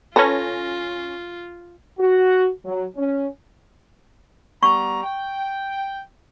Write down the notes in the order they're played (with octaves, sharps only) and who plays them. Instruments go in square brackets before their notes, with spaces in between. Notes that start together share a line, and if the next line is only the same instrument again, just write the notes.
[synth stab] C#4 A#6 [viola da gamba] F4 [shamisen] A4 B4
[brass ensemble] F#4
F#3
C#4
[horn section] G3 B3 A#5 [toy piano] C#6
[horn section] G5